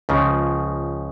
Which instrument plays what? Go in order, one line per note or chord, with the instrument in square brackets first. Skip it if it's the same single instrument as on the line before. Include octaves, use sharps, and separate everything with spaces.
[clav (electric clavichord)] C#2 C#3 F3